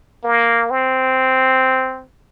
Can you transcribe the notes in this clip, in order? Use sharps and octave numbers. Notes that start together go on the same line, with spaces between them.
A#3
C4